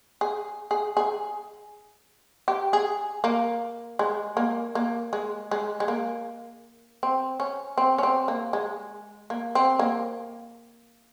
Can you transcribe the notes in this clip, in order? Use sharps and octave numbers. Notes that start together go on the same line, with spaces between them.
G#4
G#4
G#4
G4
G#4
A#3
G#3
A#3
A#3
G#3
G#3
G#3
A#3
C4
C#4
C4
C#4
C4
A#3
G#3
A#3
C4
A#3